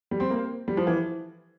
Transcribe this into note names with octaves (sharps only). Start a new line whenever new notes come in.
G3
C4
A#3
G3
F3
E3